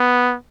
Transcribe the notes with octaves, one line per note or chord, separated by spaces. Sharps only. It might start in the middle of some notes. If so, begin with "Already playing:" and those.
Already playing: B3